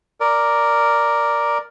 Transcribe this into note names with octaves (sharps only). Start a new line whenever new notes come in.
A#4 D5